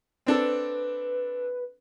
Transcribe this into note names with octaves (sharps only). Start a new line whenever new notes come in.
C4 D4 A4 B4